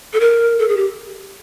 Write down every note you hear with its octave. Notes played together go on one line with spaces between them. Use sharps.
A4
A#4
A4
G#4
G4